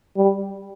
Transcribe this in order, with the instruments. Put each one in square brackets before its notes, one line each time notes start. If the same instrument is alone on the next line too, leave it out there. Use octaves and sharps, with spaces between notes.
[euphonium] G3